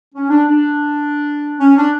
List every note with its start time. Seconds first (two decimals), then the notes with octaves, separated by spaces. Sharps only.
0.14 C#4
0.29 D4
0.47 D4
1.60 C#4
1.76 D4